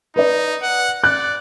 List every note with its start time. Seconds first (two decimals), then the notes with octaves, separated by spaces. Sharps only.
0.16 D#4 B4 D5
0.62 F#5
1.04 D5 F#6